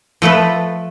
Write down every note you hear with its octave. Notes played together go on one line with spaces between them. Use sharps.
F3 A3 A4 B4